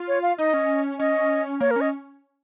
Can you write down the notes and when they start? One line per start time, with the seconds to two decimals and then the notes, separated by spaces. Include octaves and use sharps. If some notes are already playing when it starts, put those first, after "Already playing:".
Already playing: F4
0.08 C#5
0.22 F5
0.38 D#4 D#5
0.53 C#4
0.99 C#4 D#5
1.60 A#3 C#5
1.71 A#4
1.76 C#4
1.81 D#5